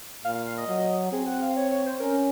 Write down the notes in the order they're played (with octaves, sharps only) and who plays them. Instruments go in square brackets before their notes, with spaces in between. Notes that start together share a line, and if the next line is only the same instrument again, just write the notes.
[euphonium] A#2 [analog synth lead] F5
[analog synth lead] F5
F5
D#5
[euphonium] F#3
[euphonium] C4 [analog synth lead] G#4
[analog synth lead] F#5
F5
C#5
C#5
C5
[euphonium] C#4 [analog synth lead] A#4